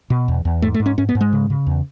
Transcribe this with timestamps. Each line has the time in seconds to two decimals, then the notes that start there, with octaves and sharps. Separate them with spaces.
0.10 B2
0.28 E2
0.45 E2
0.62 G#2 A3
0.74 A3
0.80 G#2
0.86 C#4
0.98 G#2 C#4
1.09 B3
1.15 G#2
1.21 G#3
1.33 C#3
1.50 C#3
1.67 E2